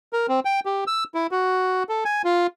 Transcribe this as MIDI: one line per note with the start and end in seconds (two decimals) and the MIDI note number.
0.13 0.27 70
0.29 0.40 60
0.45 0.60 79
0.66 0.84 67
0.87 1.04 88
1.15 1.27 64
1.31 1.83 66
1.89 2.04 69
2.05 2.22 80
2.24 2.47 65